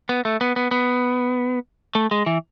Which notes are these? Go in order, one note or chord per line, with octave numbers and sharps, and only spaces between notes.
B3
A3
B3
B3
B3
A3
G#3
E3